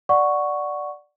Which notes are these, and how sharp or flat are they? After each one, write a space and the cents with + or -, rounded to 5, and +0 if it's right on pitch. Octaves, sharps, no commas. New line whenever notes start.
D5 +0 F#5 +0 C#6 +0